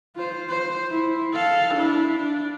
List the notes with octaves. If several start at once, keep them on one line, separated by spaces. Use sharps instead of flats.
F4 C5
C5
E4
A4 F5
D4 E4
D4